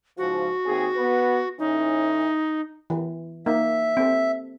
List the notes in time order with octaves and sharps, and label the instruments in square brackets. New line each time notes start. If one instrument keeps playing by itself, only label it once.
[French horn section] G#2 C#3 F3 [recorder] F#4
[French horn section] D#2 C4 G#4
B3 B4
[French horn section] A2 E3 C#4 [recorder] D#4
[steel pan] E3
[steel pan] A#3 D#4 [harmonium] E5
[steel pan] C4 A4